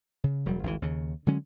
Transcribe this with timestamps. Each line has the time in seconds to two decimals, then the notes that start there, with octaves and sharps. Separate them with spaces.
0.24 C#3
0.46 E1 F#3 G3
0.63 G#1 D2 B2 E3
0.82 D#2 C#3
1.27 D3 F#3 G#3 C#4